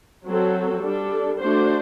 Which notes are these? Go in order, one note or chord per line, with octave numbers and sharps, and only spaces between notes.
F#3 C4 F#4 A4
G3 D4 A4
A3 D4 F#4 C5